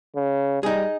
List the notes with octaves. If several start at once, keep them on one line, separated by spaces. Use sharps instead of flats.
C#3
G3 D#4 G#4